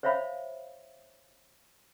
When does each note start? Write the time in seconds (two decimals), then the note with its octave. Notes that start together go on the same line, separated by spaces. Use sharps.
0.03 C5 C#5 E5 F5 B5